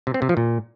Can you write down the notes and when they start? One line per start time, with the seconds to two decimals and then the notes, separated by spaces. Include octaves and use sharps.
0.07 C3
0.14 C4
0.22 C3
0.29 F3
0.37 A#2